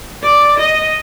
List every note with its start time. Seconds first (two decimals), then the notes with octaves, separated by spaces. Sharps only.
0.23 D5
0.59 D#5